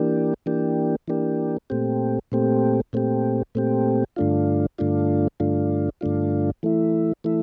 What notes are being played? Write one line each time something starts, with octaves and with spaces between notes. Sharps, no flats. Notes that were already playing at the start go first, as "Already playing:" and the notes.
Already playing: E3 A#3 D4 G4
E3 A#3 D4 G4
E3 A#3 D4 G4
A#2 A3 C4 G4
A#2 A3 C4 G4
A#2 A3 C4 G4
A#2 A3 C4 G4
G2 D3 A3 D4 F4
G2 D3 A3 D4 F4
G2 D3 A3 D4 F4
G2 D3 A3 D4 F4
E3 A3 E4
E3 A3 E4